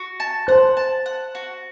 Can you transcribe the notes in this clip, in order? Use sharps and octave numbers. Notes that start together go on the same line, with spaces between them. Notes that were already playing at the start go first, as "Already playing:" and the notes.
Already playing: F#4
A5
C5 F#5
A5
F#5
F#4